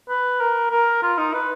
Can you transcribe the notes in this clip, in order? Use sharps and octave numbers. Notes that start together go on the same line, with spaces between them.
B4
A#4
A#4
F4
D#4
B4